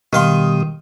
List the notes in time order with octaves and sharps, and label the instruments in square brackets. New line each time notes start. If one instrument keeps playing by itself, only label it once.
[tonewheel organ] B2 G3 D#6 [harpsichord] D#3 F5 C6